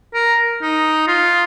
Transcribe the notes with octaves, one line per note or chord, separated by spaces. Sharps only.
A#4
D#4
F4